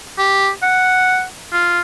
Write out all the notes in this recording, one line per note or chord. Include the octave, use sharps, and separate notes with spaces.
G4
F#5
F4